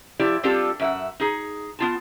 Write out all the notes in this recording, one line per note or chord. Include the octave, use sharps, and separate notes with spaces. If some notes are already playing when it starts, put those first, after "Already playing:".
F3 E4 G4 D5
G3 C4 D4 F4 G4 A4
F#2 E5 F#5
D#4 G#4
B3 F4 A5